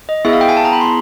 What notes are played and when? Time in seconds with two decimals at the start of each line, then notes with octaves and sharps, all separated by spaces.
0.09 D#5
0.25 B3 E4 G#4 E5
0.33 F5
0.41 G5
0.49 G#5
0.57 A5
0.65 A#5
0.73 B5
0.81 C6